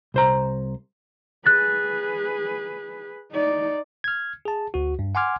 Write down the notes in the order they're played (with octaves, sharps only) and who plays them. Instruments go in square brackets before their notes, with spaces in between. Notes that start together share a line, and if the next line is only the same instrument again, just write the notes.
[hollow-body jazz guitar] C2 C5 A#5
[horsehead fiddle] G#4 B4 [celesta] F#6 A6
[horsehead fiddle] D#4 D5
[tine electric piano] F6 G#6
G#4 A5
D2 F#4
G2
F#5 G#5 C6 D6 F6 G#6